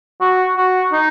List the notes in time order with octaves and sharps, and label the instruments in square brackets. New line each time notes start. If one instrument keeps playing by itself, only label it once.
[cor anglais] F#4
F#4
D#4